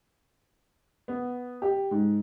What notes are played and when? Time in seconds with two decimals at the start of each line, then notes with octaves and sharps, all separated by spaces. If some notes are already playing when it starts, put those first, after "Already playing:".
1.08 B3
1.62 G4
1.91 G#2